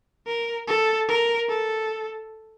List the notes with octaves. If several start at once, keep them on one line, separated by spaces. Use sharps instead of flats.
A#4
A4
A#4
A4